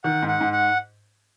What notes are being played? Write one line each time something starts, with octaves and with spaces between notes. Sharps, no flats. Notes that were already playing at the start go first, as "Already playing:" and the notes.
D#3 F#5
G#2
F#5
G#2
F#5